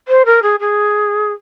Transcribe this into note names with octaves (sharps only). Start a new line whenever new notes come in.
C5
A#4
G#4
G#4